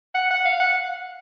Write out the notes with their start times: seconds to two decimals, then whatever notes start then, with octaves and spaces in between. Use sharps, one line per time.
0.15 F#5
0.31 F#5
0.45 F5
0.60 F#5